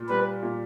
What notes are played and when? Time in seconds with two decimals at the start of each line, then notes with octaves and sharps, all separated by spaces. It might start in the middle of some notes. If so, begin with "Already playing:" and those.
Already playing: A#2
0.09 G3 B4
0.43 A#2